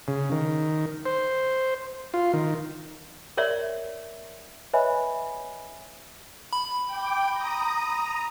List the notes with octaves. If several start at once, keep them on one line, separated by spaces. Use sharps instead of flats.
C#3
D#3
C5
F4
D#3
A#4 C#5 D5 E5
B4 C#5 D#5 E5 G#5 B5
B5
G5 D6
A#5 D#6